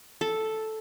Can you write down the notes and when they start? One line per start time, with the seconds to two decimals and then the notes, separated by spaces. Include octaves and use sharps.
0.21 A4